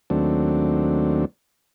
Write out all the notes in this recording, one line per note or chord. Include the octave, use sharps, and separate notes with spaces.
D#2 F#3 A3 C4 D4